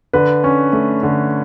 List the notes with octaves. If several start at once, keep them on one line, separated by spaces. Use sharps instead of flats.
D3 B4
C#4
A3
D3